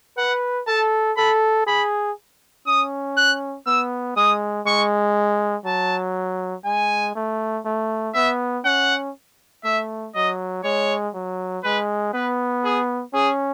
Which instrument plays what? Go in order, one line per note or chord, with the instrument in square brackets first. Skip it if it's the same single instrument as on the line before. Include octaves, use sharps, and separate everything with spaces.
[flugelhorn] B4 [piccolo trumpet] F#5
[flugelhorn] A4 [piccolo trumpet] A5
[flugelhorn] A4 [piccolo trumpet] B5
[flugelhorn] G#4 [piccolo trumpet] B5
[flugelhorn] C#4 [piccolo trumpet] D#6
[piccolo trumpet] F#6
[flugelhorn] B3 [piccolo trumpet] E6
[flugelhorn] G#3 [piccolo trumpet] D#6
[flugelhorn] G#3 [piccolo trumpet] C#6
[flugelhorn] F#3 [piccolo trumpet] A5
[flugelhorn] G#3 [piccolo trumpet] G#5
[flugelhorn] A3
A3
[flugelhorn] B3 [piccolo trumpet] E5
[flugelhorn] C#4 [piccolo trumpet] F#5
[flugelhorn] A3 [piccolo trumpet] E5
[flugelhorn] F#3 [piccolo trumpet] D#5
[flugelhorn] G#3 [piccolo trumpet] C#5
[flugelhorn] F#3
[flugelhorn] G#3 [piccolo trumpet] B4
[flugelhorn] B3 [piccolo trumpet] B4
[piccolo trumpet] G#4
[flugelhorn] C#4 [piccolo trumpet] G#4